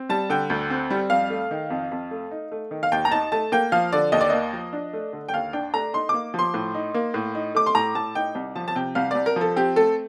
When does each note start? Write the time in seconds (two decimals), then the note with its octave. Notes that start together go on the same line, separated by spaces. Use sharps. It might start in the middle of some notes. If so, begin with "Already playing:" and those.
Already playing: C4
0.09 G3 A5
0.30 D3 G5
0.50 D2
0.70 C4
0.91 G3
1.10 F2 F5
1.30 A3
1.51 D#3
1.70 F2
1.92 F2
2.11 A3
2.31 D#4
2.52 A3
2.71 D#3
2.83 F5
2.92 D#2 G5
3.05 A#5
3.12 D#4 A5
3.32 A3 A5
3.52 A#3 G5
3.72 F3 F5
3.92 D3 D5
4.12 D#2 D#5
4.21 D5
4.30 A#3 D#5
4.53 F3
4.73 D4
4.93 A3
5.13 D3
5.29 G5
5.33 D#2 F5
5.53 D4 G5
5.74 A3 A#5
5.94 D#4 C6
6.09 A#3 D6
6.34 F3 C6
6.54 A2
6.74 D#4
6.94 A#3
7.14 A2
7.35 D#4
7.55 A3 D6
7.66 C6
7.75 A2 A#5
7.95 A2 A5
8.15 D#4 G5
8.35 C2
8.56 F3 A5
8.68 A5
8.75 C3 G5
8.95 C2 F5
9.11 C2 D5
9.26 A#4
9.36 F3 A4
9.56 C4 G4
9.76 A3 A4